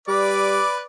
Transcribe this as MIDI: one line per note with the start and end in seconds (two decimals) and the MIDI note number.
0.08 0.60 55
0.08 0.84 71
0.08 0.84 74
0.08 0.84 86